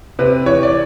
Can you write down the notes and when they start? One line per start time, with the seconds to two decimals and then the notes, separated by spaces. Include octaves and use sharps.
0.19 C3 B4
0.45 E3 C#5
0.63 D5